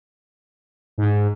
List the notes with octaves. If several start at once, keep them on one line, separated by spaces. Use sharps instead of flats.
G#2